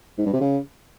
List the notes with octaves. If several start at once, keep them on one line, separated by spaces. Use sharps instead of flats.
G#2
G2
C3
C#3